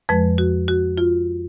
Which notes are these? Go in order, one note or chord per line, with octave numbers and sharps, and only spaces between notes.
F2 F3 G#3 B4
F#4
F#4
F4